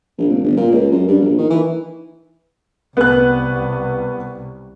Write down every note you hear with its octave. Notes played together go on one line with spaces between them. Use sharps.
A#1
F1
G1
A#2
C#2
F#2
G2
A#1
D#3
E3
C2 B3 F#6